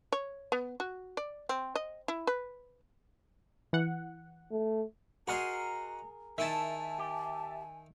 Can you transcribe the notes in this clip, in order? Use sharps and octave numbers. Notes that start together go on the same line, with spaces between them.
C#5
B3
F#4
D5
C4
D#5
E4
B4
E3 F#5
A3
F#4 G#4 A#4 D#5 A#5 C6
D#3 E4 E5 G#5 A5
G4